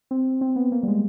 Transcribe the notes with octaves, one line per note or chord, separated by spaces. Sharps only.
C4
C4
B3
A#3
G3
G#3